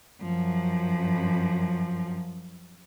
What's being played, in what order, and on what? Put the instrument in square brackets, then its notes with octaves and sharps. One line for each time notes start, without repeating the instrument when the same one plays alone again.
[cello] F#2 F3